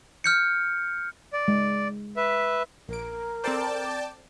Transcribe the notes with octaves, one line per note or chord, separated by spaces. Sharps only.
F6 G6 C#7
D5
G#3
B4 E5
A#1 A#4 D7
C4 A4 C5 D5 G5 A5